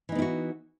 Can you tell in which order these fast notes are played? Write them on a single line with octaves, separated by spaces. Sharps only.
E3 D#4 B3 E4 F#4